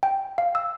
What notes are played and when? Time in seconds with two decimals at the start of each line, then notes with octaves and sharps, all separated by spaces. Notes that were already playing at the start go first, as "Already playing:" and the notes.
0.03 G5
0.38 F5
0.55 E6